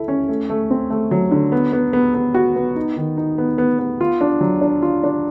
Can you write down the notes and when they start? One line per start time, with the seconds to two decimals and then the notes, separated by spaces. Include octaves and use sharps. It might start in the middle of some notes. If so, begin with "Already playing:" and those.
Already playing: E4 A4
0.08 C#4
0.29 A3
0.50 A3
0.70 C4
0.90 A3
1.11 F#3
1.31 D3
1.52 B3
1.73 B3
1.93 B3
2.14 B3
2.34 F#4
2.56 B3
2.76 D#4
2.97 D#3
3.17 D#4
3.38 B3
3.58 B3
3.79 B3
4.01 F4
4.21 D4
4.41 F#3
4.61 D4
4.82 F4
5.04 D4